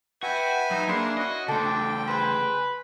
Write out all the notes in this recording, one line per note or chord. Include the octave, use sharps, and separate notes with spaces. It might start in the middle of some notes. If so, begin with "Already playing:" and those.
F#4 B4 E5 G5 G#5
F#3 D#4
A#3 D4 E4 G#4 D5 C6
C#4 F#4 D#5
C#3 A3 D4 A4 C5 G5
G#4 B4 C5